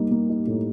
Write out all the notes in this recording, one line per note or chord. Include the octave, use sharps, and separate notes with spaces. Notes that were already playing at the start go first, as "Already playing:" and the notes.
Already playing: G3 A#3 D#4
A#3
D#4
A2